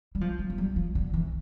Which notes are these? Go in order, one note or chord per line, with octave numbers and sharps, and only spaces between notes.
G3
F3
G3
F3
G3
F3
D3
E3